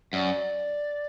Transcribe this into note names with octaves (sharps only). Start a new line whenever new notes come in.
F#2 D5